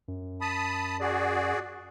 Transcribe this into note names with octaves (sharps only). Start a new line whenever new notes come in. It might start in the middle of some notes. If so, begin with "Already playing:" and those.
F#2
A5 B5 D#6
F#4 G#4 D5